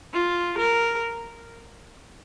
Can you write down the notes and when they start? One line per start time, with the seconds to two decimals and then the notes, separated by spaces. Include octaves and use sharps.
0.13 F4
0.58 A#4